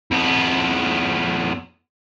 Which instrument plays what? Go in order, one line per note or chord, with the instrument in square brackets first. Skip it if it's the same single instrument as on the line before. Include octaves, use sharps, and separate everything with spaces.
[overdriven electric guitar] F2 B3